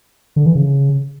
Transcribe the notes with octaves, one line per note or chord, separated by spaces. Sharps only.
D3
E3
C#3